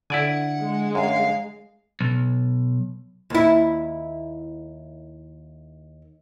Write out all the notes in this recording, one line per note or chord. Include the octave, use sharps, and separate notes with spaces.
D3 E4 D5 F#5 G#5
G#3
F#2 F5
B1
D#2 E4